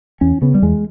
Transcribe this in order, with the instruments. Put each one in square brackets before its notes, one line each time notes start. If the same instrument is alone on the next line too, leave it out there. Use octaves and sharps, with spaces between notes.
[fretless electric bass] E2 C#4
C#3 B3
G3
E2 G#3